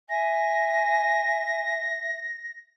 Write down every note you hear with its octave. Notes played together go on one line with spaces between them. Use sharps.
E5 G#5 A#6